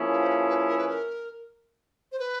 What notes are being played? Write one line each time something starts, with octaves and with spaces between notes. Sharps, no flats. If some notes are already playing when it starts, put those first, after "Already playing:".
Already playing: F3 A#3 C#4 E4 G#4
B4
C5
B4
B4
A#4
B4
A#4
C5
B4